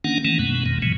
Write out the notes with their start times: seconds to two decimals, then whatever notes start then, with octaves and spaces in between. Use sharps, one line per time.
0.04 D#3 A#3 C#4 D4 F#5
0.25 D#3 E3 A3 A#3 C#4
0.39 F#2 B2 G#3 B3
0.66 F2 B2 D#3
0.82 A#2 C#3 E3 F#3 G#3